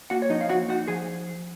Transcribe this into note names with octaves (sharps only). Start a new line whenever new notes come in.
A#3 F#4 F#5
C#5
F3 D#4 D#5
F5
A#3 F#4 F#5
D#4 F#4 F#5
F3 G#4 G#5